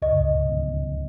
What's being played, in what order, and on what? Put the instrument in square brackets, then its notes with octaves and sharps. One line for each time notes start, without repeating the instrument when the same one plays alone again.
[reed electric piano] C#2 [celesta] D#5